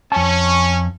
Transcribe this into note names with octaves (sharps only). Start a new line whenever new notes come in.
F2 C#4 A5